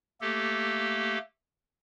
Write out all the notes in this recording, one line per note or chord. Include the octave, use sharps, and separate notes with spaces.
A3 A#3 G4 A4